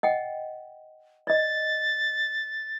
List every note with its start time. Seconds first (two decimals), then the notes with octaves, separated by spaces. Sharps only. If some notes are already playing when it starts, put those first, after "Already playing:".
0.03 D#5 F#5 G5
1.27 D5 D#5 A6